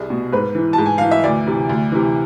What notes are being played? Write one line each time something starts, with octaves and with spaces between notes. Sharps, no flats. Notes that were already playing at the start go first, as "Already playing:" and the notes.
Already playing: C2 G#4
B2
G#2 B4
E3
G#2 A5
G#5
E3 F5
E5
D2 D5
C3 E3
D2
C3 E3